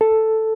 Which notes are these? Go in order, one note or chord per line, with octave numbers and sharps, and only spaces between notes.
A4